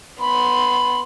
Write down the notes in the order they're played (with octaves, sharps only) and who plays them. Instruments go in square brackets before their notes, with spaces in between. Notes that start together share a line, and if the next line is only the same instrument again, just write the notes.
[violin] B3 C6 [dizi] B5